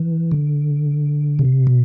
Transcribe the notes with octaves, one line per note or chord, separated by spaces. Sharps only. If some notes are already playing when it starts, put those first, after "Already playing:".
Already playing: E3
D3
C3
B2